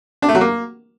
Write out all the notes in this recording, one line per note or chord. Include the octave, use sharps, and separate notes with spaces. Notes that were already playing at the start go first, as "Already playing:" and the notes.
D4
A3
F#3
A#3